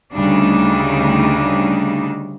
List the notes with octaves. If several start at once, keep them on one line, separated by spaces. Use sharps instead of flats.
D2 C#3 G3 D4 D#4